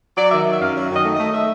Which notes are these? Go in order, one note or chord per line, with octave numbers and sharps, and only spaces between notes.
F#3 D5
D#3 E5
F#3
E5
F#2 F5
F#3
D#3 D#5
A3
A3 D#5
A3 E5